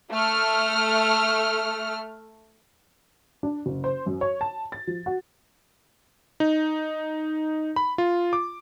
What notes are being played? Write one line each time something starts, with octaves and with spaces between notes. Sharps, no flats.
A3 F6
D4
F#1
C5
F#2
C#5
A5
A6
F3
F#4
D#4
B5
F4
D6